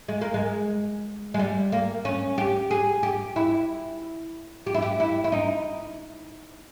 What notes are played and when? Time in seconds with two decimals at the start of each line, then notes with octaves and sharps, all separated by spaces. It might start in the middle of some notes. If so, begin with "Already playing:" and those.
0.08 G#3
0.21 A#3
0.34 G#3
1.34 G#3
1.39 G3
1.72 A#3
2.05 C#4
2.38 G4
2.71 G#4
3.03 G4
3.36 E4
4.66 G4
4.74 E4
4.82 G4
5.00 E4
5.24 E4
5.32 D#4